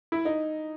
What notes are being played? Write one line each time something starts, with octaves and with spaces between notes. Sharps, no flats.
E4
D#4